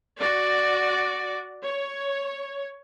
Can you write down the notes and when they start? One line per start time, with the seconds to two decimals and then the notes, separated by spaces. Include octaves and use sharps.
0.19 F#4 D5
1.64 C#5